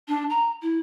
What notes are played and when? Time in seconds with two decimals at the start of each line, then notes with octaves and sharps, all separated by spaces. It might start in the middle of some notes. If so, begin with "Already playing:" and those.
0.08 D4
0.30 A#5
0.62 E4